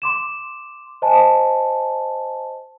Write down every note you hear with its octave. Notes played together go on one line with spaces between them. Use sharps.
C6 D6 E7
C5 D#5 G#5 A5